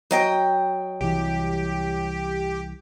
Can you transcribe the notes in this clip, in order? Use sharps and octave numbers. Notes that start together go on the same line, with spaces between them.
F#3 D#5 G5
C2 E3 G4